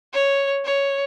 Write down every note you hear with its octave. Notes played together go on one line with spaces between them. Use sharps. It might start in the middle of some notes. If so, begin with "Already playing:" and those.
C#5
C#5